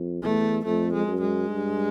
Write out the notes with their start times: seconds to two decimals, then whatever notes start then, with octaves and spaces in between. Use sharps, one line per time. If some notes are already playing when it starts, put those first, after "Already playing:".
Already playing: F2
0.23 E2 A3
0.65 F2 A3
0.94 G#3
1.07 F#2
1.21 G#3
1.49 G2